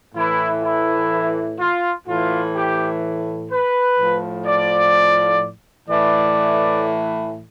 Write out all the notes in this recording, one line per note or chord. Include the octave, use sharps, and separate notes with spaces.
A2 E3 E4
E4
F4
A2 E3 F4
G4
B4
A2 F3
D5
A2 E3 D5